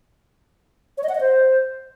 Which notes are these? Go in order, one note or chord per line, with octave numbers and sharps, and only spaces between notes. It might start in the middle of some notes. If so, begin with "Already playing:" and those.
C#5
D#5
F#5
D#5
C5